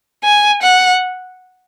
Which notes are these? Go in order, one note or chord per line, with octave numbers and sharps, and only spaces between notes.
G#5
F#5